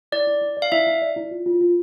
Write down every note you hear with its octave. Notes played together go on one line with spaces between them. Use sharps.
E4 D5
E4
E4
D5
F5
E4 E5
E4
D5
E4
F4
F4
F4